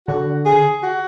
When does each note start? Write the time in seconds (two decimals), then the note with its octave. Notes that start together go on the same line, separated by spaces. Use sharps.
0.08 D3 F#4
0.45 G#4
0.83 F#4